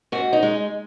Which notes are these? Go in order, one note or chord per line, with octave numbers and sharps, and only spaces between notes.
G#2 F#4
D#4
G#3